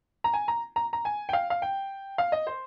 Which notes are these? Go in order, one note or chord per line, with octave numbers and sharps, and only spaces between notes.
A#5
G#5
A#5
A#5
A#5
G#5
G5
F5
F5
G5
F5
D#5
C5